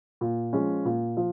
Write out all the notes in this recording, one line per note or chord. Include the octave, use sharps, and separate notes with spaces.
A#2
F3 G#3 C#4
A#2
F3